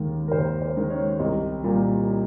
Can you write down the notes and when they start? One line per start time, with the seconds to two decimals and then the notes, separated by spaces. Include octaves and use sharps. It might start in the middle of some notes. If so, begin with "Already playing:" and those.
Already playing: D#2 D#3 G#3
0.28 A#4
0.32 D#2 C5
0.62 C5
0.76 D#3 G#3
0.90 C#5
1.20 C2 D#5
1.63 A#2 G3